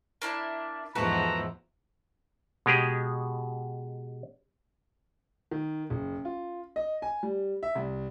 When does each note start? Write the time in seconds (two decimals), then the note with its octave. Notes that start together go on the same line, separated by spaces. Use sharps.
0.22 A#3 D4 E4
0.95 E2 G#2 F3 F#4 A4 B4 A#5
2.66 B2 G#3 G4 G#4
5.51 D#3
5.90 F#1
6.25 F4
6.76 D#5
7.02 G#5
7.23 G3
7.63 E5
7.75 C2